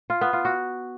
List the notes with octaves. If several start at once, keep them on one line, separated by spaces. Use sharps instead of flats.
F4
B3
F4
F#4